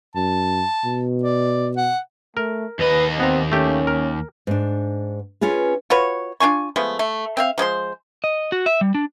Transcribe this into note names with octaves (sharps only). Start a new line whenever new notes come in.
F#2 A5
B2
D5
F#5
A3 A#4
D#2 B4 D#5
B3 C4 A#5
A3 C#4 G4
A#4
G#2 D4
C#4 F4 G#4 B4
F4 F#4 B4 C#5
D4 F4 G#5 C#6
F3 G#3 A3 B3
A3
C4 E5 F5
F3 G#3 C5 C6
D#5
F#4
E5
G3
D4